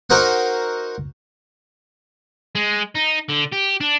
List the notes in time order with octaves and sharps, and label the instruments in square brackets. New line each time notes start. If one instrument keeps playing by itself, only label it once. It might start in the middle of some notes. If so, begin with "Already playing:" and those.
[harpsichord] D#4 F#4 A#4 C5 D#5 F#5
[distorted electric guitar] G#3
D#4
D3
G4
D4